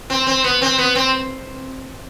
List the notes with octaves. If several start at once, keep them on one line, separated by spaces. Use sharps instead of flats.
C4
C4
B3
C4
B3
C4